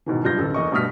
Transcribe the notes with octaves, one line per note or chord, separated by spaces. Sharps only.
G#2 B2 D#3 E3
F#1 G2 F4 G6 A#6
A1 D2 A4
E2 A#3 D#5 C#6
G2 B2 A3 D#6 F6 B6